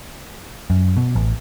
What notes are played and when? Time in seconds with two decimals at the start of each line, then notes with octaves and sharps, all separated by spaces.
0.70 F#2
0.97 B2
1.15 A1